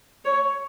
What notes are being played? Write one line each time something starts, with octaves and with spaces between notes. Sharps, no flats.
C#5